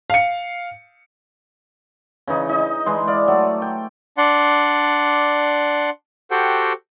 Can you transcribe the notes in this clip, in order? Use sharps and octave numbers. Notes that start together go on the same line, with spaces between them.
F5 C#7
C#3 E3 D#4
D#4 D#5
E3 G#3 C6
D5 F5
F#3 A3
G5
D4 D5 F#5 C6
F#4 G4 A4 C5 F#5 G5